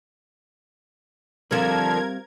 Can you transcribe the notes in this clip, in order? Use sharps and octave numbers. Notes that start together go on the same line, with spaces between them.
D3 F3 G3 C4 F4 A#4 G#6